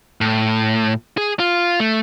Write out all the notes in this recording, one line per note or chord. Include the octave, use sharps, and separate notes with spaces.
A2
G#4
F4
A3